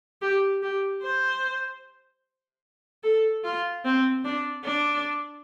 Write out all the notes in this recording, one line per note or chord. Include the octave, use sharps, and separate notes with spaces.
G4
G4
C5
A4
F4
C4
D4
D4